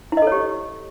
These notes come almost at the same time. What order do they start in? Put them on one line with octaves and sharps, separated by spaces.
E4 D#5 A4 C#5 G4